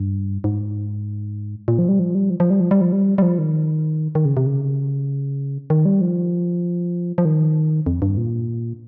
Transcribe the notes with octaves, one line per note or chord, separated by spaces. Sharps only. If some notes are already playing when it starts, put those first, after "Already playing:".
Already playing: G2
G#2
A#2
F3
G3
F3
G3
F3
F3
G3
F3
G3
F3
G3
G3
F3
D#3
D#3
C#3
C3
C#3
D#3
G3
F3
F3
D#3
F2
G2
A#2